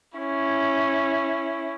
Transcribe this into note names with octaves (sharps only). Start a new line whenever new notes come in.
C#4 E4